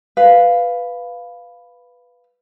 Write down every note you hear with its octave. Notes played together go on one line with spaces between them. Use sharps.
B4 F5